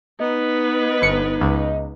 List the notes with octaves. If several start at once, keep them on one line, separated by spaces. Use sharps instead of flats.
B3 D#4 B4
G1 C#7
C#2